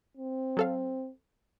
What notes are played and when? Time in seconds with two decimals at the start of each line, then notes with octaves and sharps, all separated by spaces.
0.17 C4
0.57 F#3 A4 F5